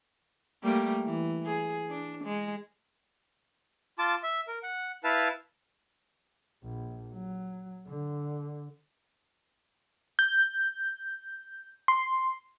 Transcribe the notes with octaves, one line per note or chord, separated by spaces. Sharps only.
G3 A3 A#3
E3
G#4
D4
G#3
F4 A5 D6
E5
A#4
F#5
E4 B4 F5 A5
A#1
F#3
D3
G6
C6